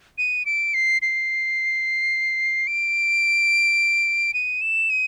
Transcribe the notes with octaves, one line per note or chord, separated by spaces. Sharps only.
D#7
D7
C7
C7
D7
D#7
E7
D#7